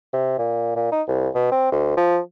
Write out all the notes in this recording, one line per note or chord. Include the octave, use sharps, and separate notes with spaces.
C3
A#2
A#2
D#4
C2
B2
C4
D2
F3